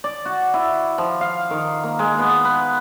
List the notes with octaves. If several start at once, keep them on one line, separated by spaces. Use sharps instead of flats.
D5
F#4
E4
F3
F5
D#3
A#3
G#3
B3
B4